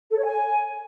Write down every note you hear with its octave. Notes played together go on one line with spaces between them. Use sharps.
A4
C#5
G#5